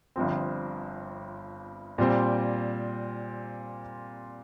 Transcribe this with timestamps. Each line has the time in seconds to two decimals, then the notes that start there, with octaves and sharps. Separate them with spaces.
0.16 G1 G2 F3 C4
1.98 A#2 G3 C4